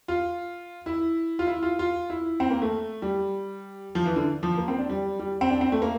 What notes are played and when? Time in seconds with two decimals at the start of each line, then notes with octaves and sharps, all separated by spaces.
0.08 F4
0.86 E4
1.39 F4
1.47 E4
1.62 F4
1.79 F4
2.10 E4
2.40 C4
2.50 A#3
2.62 A3
3.02 G3
3.95 F3
4.06 E3
4.16 D3
4.43 F3
4.58 A#3
4.68 C4
4.79 D4
4.89 G3
5.19 G3
5.41 C4
5.50 D4
5.61 C4
5.72 A3
5.82 A#3